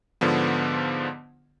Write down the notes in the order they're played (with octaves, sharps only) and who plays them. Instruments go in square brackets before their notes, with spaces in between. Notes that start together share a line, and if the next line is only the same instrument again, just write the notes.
[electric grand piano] G#2 D3 F3 B3